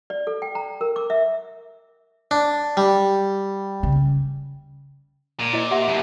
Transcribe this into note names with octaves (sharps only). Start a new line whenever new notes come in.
D5
A4
G5
A#5
A#4
D6
E5
D4
G3
C#3
A#2
E4 C5 D#5
G4 E5 F#5
F#2 B2 B5